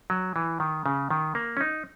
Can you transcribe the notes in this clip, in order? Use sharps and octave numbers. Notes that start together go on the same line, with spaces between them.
F#3
E3
D#3
C#3
D#3
A#3
C#4
D#4